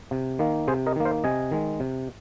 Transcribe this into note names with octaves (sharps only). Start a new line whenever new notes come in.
C3
D#3 A#3
C3 G#4 C5
A#4 D#5
D#3 A#3
C5 F5
C3 D#5 G#5
D#3 G#3
C3